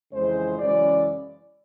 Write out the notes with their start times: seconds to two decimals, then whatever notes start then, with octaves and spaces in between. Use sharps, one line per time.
0.13 F2 C#3 E3 G#3 C5
0.59 F#2 C#3 E3 G#3 C#4 D5